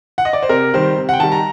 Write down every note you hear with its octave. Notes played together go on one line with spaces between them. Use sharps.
F#5
D#5
D5
C5
C3 A#4
D#3 G3 C5
C3
F#5 G5
D#3 G3 A5
A#5